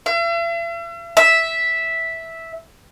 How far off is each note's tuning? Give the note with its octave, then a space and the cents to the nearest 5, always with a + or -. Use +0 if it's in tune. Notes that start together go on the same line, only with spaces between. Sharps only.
E5 +45
E5 -5